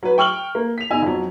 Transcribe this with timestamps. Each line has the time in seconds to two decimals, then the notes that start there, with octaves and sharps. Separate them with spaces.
0.03 F#3 B4
0.18 G5 C#6 F6 F#7 G7
0.55 A#3
0.78 B6 F7
0.91 G1 D#4 D#5 G#5 E6
1.03 F2 F#3